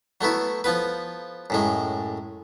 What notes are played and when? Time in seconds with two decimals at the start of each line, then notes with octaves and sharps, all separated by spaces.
0.21 F#3 A3 B3 E4
0.64 F3 B3 B4
1.50 F#2 A2 G#3